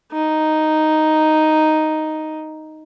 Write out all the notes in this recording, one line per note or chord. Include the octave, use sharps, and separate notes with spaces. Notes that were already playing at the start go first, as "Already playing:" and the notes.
D#4